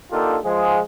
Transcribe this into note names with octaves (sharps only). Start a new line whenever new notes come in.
D3 A#3 D#4 F4 G4 A4
F3 G#3 G#4